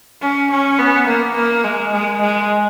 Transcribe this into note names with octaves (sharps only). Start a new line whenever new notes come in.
C#4
C#4
B3
A#3
A#3
G#3
G#3
G#3